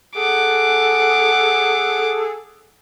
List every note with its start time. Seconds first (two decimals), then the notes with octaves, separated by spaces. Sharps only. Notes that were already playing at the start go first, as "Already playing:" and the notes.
0.16 G#4 A4 F#5 D6